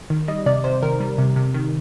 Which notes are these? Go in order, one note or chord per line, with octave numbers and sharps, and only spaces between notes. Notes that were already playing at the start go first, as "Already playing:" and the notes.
D#3
G3 D#5
C3 D5
C3 C5
D#3 A#4
G3
C3
C3
D#3